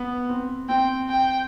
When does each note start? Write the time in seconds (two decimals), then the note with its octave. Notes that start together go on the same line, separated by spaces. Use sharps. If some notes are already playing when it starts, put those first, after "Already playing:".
Already playing: B3
0.29 C4
0.69 C4 G5
1.10 G5